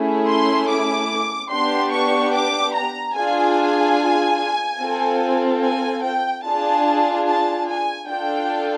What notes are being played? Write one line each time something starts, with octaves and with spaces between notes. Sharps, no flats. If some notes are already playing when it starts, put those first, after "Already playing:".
Already playing: A3 C#4 E4 G#4
C6
D6
B3 D4 G4 C6
C#6
D6
A#5
D4 F4 G#4 G#5
C4 F4 A4
G#5
G5
D4 F4 G#4 A5
A5
G#5
D4 F4 A4 G5